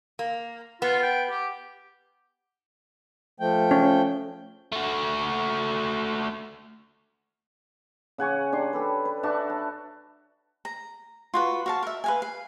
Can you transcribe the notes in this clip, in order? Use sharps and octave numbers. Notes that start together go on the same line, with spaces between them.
A#3
B3 F4
G5
G4
F3 A3 G5
C#4
A3 F#4
C#3 F#5 G#5 C#6
D4 G4 C6
G4 A4 B4
B4
D4 F#4 E5 A5
A5
A#5
F4 F#4 B4
F#4 F5 A5
A#4 E5
B4 F5 G#5
F5